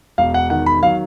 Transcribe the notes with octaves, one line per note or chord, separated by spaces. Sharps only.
E1 F5
F#5
D#3 F#5
B5
F#3 F5